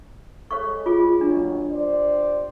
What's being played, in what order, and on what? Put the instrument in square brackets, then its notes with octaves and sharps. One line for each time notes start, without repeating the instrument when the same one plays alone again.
[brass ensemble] G#3 A4 [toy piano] C#5 F5 C#6
[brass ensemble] G#3 [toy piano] F4 G#4
[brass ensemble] A#2 D#3 F#3 [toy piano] D4
[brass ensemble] G4 C5 D5